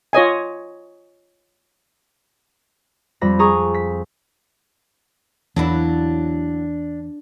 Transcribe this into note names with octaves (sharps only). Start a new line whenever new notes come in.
F4 C#5 D#5 G#5
F2 G3 B5 A#6
G#4 G#5 A#5 C#6 D#6
B6
E2 F#3 A#3 D4 E4